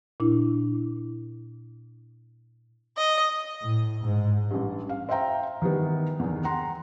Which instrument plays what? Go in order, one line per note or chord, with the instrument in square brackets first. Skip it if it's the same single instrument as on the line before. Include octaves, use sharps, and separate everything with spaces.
[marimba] A#2 D4 E4
[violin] D#5
[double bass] A2
G#2
[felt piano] A1 G2
F5
C5 E5 F5 G5 A#5
D#3 E3 G3 B3
E2 D#3
F#5 G5 A#5 C6